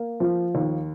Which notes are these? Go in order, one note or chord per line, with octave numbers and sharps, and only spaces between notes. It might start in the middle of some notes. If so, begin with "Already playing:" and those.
Already playing: A#3
F3
D#2